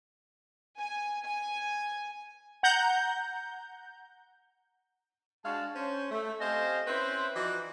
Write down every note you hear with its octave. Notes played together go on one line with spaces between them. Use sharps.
G#5
G#5
F#5 A#5 G6
G#3 D4 F#4 F5 A5
C#4 C5
A3
C4 G4 C5 D#5 F5 G#5
C4 C#4 E4 B4 C5
E3 F3 D#4 F#4 D5